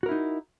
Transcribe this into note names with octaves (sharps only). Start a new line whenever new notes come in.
D#4 E4 F#4 A#4